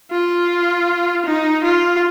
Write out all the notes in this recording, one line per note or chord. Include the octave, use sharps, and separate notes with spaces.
F4
D#4
F4